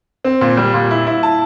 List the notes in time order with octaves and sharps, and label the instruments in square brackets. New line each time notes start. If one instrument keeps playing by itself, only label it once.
[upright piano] C4
A#2
G3
A#2
E4
E4
A5